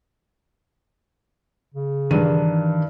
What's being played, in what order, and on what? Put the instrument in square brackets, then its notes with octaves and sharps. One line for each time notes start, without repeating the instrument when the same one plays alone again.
[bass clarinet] C#3
[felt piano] G2 D4 D#7 [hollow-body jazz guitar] D#3 [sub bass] E3